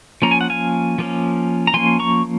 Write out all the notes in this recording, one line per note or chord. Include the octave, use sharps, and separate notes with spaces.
F3 A#3 C#4 A#5
G#5
F#5
F5 G#5
F3 A#3 C#4
A#5
F3 A#3 C#4 G#5 C6
A#5 C#6